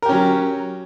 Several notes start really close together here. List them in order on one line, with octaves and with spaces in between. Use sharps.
A#4 G4 C#4 F#3